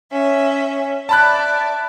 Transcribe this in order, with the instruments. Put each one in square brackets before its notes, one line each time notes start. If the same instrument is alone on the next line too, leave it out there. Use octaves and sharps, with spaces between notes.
[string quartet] C#4 E5
[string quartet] D5 E5 [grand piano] A5 B5 F#6